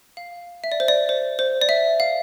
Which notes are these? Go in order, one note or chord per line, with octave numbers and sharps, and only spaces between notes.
F5
E5
D5
C5
D5
C5
C5
D5
E5
F5